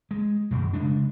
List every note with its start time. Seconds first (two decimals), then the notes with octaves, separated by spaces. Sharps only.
0.11 G#3
0.51 F#2 B2 D#3
0.73 C#3 G#3 D4